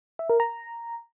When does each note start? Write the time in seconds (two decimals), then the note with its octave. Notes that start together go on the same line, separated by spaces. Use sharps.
0.19 E5
0.30 A#4
0.40 A#5